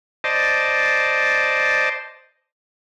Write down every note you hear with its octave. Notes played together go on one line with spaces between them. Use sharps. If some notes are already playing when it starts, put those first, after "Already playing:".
C5 D5 D#5 A5